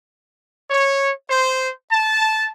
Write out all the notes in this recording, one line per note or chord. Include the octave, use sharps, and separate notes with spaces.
C#5
C5
A5